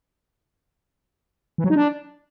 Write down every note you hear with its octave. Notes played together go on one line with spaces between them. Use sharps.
E3
F#3
D#4
D4